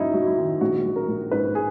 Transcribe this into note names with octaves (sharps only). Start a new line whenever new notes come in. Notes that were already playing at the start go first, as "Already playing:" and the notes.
Already playing: F#1 F#2 D#4 E4
F#3
E4
D#3
A#1 F#4
F#3
A#4
A#1
G#2 B4
G#4